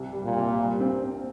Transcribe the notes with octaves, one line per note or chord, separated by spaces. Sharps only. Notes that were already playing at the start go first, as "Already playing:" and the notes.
Already playing: C2
G3
A#2
C2
G3
C4
C4